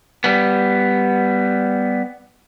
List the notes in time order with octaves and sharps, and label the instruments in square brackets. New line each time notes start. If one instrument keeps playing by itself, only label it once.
[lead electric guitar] G3 B3